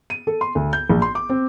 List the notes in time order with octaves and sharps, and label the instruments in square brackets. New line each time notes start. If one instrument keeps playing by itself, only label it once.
[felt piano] D#7
A4
C6
D2
G6
A#1
C6
D6
C4